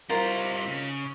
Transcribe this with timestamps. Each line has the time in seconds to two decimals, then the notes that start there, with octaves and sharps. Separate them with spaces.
0.10 G3 D#4 F4 A#4 C5
0.68 C#3